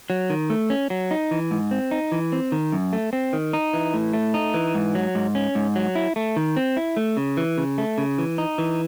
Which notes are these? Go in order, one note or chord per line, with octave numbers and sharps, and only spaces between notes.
F#3
D#3
A3
C#4
F#3
D#4
E3
G#2
C4
D#4
E3
C4
D#3
F#2
A3
C4
D#3
D#4
E3
A2
A3
D#4
E3
G#2
F#3
G#2
C#4
G#2
F#3
E4
A3
D#3
C4
E4
A3
C#3
E3
C#3
A3
C#3
E3
D#4
E3